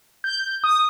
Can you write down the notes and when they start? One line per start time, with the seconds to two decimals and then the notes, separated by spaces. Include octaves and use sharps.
0.24 G6
0.64 D#6